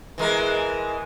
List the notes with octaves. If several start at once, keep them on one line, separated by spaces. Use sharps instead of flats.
E3 G#3 A#4